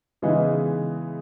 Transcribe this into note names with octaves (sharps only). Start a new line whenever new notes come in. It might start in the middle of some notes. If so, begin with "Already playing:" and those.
C#3 E3 G#3 B3 D#4